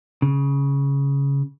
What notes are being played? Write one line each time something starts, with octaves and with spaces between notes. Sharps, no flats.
C#3